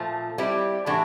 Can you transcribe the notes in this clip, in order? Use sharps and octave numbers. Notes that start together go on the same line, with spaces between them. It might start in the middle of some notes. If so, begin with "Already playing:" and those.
Already playing: A#2 F3 A3
G3 C4 E4 G4
A2 E3 A3 D4 F#4